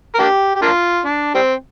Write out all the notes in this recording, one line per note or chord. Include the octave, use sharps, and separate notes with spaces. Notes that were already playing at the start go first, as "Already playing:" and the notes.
A#4
A#3 D4 G4
G4
A#3 D4 F4
D4
G3 C4